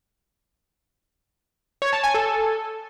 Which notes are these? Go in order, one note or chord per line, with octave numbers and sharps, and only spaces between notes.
C#5
A5
G#5
A4